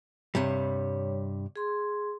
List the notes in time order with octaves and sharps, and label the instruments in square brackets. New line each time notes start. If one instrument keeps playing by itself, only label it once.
[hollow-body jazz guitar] G2 C3 G3 [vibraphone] C#5
[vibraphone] G#4 C6